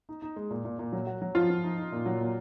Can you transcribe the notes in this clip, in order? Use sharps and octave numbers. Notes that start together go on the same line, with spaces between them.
D#4
D#4
G#3
A#2
A#2
A#2
F#3
F#4
F#3
F3 F4
F3
D#4
D#4
A#2
F#3
A#2